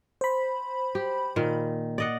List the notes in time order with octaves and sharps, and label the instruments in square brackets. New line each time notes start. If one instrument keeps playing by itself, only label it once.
[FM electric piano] C5 B5
[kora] G4
A#2 D#3
D5 D#5 F#5